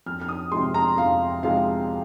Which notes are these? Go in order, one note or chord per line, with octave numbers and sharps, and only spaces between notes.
F2 F6
F6
D#6
C3 F3 G#3 C6
A#5
F2 F5
C3 F3 G#3 F5